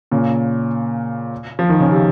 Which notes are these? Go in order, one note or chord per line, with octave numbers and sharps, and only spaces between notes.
A#2 C#3
F3
D#3
C#3
C3